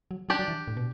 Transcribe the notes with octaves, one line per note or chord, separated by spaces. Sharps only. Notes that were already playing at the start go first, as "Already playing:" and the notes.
F#3
F#3 D4 G4 D5
F#3
E3
A2
B2